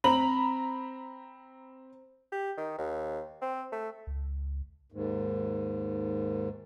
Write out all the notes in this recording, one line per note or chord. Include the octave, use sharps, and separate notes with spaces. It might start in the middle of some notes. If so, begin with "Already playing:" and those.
C4 A#5 B5 F#7
G4
D#3
D#2
C4
A3
C#2
D#2 G#2